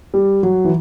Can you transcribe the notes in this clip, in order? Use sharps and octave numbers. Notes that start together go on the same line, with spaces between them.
G3
F#3
E3